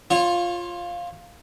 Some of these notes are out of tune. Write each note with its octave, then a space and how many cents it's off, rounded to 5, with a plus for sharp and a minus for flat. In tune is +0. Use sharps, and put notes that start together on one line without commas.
F4 +0 C#5 -30